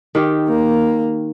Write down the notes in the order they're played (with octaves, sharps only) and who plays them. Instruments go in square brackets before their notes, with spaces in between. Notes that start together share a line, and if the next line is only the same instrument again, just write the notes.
[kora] D#3 G4
[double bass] A#3